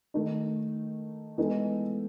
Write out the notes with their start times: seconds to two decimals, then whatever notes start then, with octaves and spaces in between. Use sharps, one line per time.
0.14 D#3 A3 D#4
1.38 E3 G#3 B3 D#4 A4